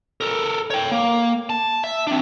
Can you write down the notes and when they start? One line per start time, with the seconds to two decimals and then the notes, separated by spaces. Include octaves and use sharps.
0.21 A4 A#4
0.70 C#5 G5
0.92 A#3
1.50 A5
1.84 E5
2.07 C4 D4